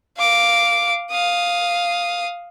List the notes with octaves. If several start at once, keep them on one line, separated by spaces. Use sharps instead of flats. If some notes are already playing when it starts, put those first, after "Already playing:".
F5 D6
F5 D#6